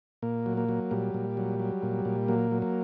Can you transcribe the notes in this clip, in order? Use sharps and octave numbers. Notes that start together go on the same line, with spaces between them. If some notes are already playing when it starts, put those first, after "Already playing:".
A#2 A#3
F#3
A#3
F#3
A#2 G3
A#2
F#3
F#3
A#2
A#2
F#3 A#3
F#3
A#3